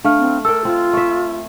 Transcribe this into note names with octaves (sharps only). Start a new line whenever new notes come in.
A3 D4 F5 F6
C4
A4 A#4 G5 E6
C4 F4
A3 E5